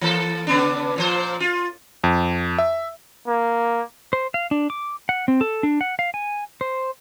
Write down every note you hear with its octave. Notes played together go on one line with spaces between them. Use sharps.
E3 A#3 A4
C#3 B3 D4
A#2 F3 C5
F4
F2
E5
A#3
C5
F5
D4
D6
F#5
C4
A4
D4
F#5
F5
G#5
C5